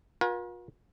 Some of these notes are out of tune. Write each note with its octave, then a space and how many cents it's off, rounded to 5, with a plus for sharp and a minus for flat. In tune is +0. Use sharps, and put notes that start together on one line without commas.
F4 +45 A#4 +45 G#5 +0